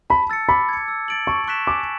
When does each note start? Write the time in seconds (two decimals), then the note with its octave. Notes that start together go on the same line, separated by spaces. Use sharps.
0.10 A5 B5
0.30 E6 A6 C#7
0.49 B5 D6
0.69 G#6 C#7
0.88 E6
1.08 A6 D7 F#7
1.27 A5 C#6
1.48 C#6 F#6 B6 E7
1.67 G#5 D6